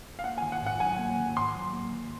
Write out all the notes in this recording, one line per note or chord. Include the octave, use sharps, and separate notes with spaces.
F5
A#3 F#5
G#5
D#3
F#5
G#2 F#5
F#3 G#5
A#3
D#3
G#2 C6
F#3
A#3
D#3